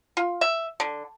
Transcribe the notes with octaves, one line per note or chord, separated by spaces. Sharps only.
F4
E5
D3